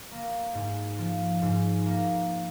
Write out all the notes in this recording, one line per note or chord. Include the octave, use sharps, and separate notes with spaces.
A#3
G#2
F3
G#2
A#3